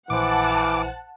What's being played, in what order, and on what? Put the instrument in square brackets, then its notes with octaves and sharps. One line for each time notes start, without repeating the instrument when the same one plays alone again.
[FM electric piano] A#1 C5 [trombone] E3 [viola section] F#5 A5 [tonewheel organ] D6